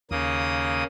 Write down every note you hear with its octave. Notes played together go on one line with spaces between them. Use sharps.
D#2 C#3 A#3 D#6